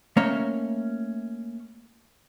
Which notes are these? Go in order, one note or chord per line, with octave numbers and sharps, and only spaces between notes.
A3 A#3 C#4 C#5 D#5